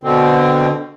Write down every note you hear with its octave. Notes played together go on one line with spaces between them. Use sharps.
B2 D3 C4